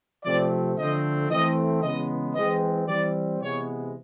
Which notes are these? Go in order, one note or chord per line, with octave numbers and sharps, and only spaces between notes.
C3 F3 A3 C4 D5
D3 F3 A3 C4 D#5
E3 A3 C4 D#5
C#3 E3 G#3 B3 D#5
E3 G#3 C4 D#5
E3 G3 C4 D5
C3 E3 G#3 B3 C#5